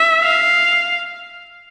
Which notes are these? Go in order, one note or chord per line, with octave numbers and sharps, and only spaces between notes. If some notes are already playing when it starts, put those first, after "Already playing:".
Already playing: E5
F5